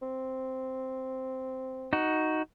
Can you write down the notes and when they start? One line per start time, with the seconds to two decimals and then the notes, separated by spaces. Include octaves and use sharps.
0.02 C4
1.93 D#4 F#4